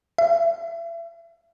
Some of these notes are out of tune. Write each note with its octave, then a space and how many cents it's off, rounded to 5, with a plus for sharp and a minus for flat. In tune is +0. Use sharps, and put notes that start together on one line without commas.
E5 +35